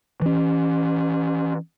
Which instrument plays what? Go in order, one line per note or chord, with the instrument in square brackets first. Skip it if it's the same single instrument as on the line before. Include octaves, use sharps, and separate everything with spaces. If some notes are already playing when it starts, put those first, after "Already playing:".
[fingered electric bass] E3 C#4